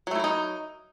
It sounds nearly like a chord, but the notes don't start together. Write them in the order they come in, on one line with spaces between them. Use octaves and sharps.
F#3 A3 E4 A#4 D#4